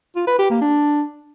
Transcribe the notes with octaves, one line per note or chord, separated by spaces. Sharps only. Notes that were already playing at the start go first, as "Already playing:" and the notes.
F4
B4
G4
A#3
D4